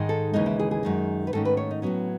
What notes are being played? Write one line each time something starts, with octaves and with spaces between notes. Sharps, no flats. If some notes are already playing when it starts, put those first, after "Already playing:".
Already playing: G#2 D#3 G#3
A4
D#2 C#3 E3 G#3 D#4
E4
G#4
G#4
F#2 D#3 G#3
B4
G#2 D#3 A3 C#4 A4
B4
C#5
D#4
A2 F#3 B3 C#4